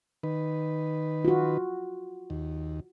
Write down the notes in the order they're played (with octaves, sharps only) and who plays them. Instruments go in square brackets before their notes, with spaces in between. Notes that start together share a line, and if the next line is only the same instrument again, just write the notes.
[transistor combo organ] D#3 B4
[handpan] F4 F#4
[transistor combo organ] D#2